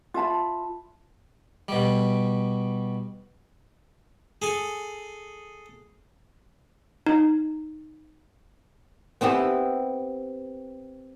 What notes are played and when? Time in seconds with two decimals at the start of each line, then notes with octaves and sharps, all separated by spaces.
0.14 F4 E5 A5 B5
1.68 B2 G3
4.42 G#4 A4 G#5
7.06 D#4
9.21 B3 C4 E4 G4